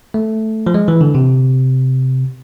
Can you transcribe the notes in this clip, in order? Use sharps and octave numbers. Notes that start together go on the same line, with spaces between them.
A3
F3
G#3
E3
D3
C3